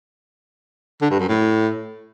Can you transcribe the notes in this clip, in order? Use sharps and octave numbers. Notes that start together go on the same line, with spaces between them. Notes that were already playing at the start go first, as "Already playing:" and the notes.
D3
G2
F#2
A2